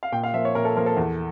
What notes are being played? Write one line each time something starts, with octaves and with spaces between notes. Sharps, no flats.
F5
A#2 G5
F5
F3 A#3 E5
C#5
A#2 A#4
A4
F3 A#3 A#4
A4
E2